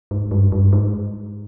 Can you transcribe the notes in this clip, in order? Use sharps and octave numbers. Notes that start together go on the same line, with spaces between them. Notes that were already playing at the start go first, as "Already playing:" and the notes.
G#2
G2
G2
G#2